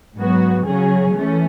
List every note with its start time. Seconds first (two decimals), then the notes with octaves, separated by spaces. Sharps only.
0.17 G#2 F#3 B3 F#4
0.66 C#3 F#3 C#4 G#4
1.15 E3 A3 C#4